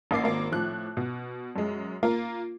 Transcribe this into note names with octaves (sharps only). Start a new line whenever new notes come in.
A1 A#3 D6 C7
G#1 A#3
A2 F3 F#6
B2
F#2 G#3
A#3 F4 A#4